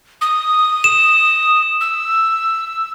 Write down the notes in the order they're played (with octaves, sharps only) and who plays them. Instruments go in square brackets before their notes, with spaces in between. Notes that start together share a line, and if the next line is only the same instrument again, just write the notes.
[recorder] D#6
[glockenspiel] E7
[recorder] E6